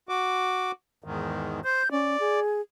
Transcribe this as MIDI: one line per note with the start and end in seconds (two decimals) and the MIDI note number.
0.09 0.71 66
0.09 0.71 86
1.04 1.60 40
1.04 1.60 44
1.04 1.60 51
1.65 1.83 72
1.65 1.91 91
1.91 2.17 61
1.91 2.40 74
2.20 2.61 68